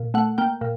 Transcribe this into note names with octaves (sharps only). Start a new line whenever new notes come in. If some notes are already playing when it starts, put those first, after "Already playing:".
Already playing: A#2
A3 F#5
A#3 G5
A#2